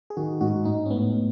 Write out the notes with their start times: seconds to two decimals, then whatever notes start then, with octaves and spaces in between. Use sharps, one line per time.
0.10 G#4
0.17 D#3 F#4
0.41 G#2 F#4
0.65 G#2 D#4
0.85 C#4
0.90 A2 B3
1.15 A2